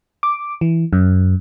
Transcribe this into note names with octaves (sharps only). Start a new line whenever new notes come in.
D6
E3
F#2